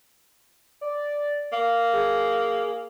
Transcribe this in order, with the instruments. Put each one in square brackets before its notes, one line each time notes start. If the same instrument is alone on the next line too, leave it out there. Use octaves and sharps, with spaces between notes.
[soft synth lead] D5
[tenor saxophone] A#3 [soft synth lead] F5
[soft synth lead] G#4